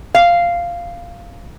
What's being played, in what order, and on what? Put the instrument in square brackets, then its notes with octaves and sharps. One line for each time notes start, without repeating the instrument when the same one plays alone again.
[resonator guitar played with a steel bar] F5